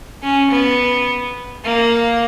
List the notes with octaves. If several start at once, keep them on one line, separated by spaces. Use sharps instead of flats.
C#4
B3
A#3